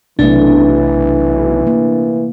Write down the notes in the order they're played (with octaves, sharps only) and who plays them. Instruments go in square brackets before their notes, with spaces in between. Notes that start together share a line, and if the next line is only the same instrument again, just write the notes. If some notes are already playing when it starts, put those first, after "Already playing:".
[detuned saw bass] B1 [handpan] C3 A3 [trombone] E3 [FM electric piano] D4
[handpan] A#3